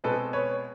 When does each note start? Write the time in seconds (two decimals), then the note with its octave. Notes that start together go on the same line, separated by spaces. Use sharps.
0.04 B2 G#3 C4 A4 B4
0.33 B4 C#5